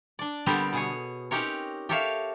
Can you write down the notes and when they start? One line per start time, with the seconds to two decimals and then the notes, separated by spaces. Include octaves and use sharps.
0.19 D4 D5
0.46 D3 G3 B3 C4 G4 A#4
0.73 B2 G#4 C#5
1.31 C4 C#4 D#4 G4 A#4 C#5
1.89 G4 A4 A#4 C#5 E5 F5